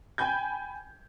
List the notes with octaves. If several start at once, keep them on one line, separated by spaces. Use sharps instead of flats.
G5 G#5 B5 G6 G#6